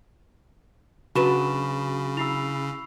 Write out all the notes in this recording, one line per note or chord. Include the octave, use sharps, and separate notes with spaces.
C#3 F#3 D4 F#4 B4 B5 C#6 E7
E4 B5 E6 C7 F7